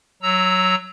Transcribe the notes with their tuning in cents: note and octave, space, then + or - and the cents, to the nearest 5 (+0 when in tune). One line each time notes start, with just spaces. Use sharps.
F#3 +0 A#5 +0 E6 -10